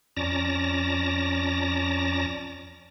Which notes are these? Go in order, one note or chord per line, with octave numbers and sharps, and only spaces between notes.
F2 C#4 D5 A5 A#5 A#6